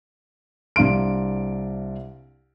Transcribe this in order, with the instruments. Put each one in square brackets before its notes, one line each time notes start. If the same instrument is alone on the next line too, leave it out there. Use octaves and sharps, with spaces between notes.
[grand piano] C2 D4 F5 C6 D7